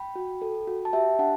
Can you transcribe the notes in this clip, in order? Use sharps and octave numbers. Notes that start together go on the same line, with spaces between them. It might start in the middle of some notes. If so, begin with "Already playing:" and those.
Already playing: G5 B5
F#4
A4
F#4
A5
G4 E5 G5
D4 F#5 A5